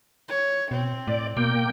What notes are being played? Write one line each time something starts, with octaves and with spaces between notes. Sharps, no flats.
C#5
B2 C4
A2 D5
B2 A#3 G5